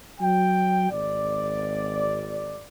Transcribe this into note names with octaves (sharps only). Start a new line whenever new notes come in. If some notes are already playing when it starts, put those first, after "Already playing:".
F#3 G5
G#1 D5